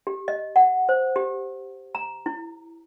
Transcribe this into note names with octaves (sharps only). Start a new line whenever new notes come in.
G4
D#5
F#5
C5
G4
A#5
E4